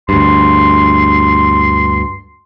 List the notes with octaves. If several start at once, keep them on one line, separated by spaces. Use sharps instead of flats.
D2 G2 C6